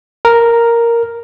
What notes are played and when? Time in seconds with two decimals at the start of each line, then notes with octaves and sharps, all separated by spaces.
0.25 A#4